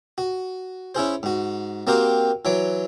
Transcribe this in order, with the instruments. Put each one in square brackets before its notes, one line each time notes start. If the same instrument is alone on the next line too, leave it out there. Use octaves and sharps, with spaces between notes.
[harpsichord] F#4
C#4 E4 G#4 C5
G#2 F#4
A#3 C4 F#4 G4 A#4 C5
E3 F#3 C#5 D6